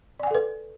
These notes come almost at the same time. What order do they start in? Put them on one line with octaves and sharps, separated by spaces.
D5 G#5 F#5 A4 B4